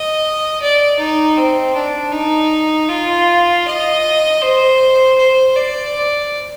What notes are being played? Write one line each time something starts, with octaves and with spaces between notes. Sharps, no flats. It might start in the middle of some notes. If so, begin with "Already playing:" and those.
Already playing: D#5
D5
D#4
C4
D4
D#4
F4
D#5
C5
C5
D5